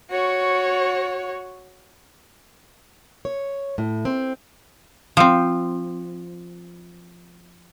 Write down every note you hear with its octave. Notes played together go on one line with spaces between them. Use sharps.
F#4 C#5
C#5
A2
C4
F3 C4